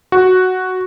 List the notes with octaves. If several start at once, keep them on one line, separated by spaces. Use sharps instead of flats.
F#4